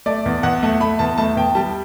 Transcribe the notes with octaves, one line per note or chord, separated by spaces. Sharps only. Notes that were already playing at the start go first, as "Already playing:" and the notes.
A3 D5
E2
E2 F#5
A3
A3 B5
E2 A5
A3 A5
E2 G5
G3 A5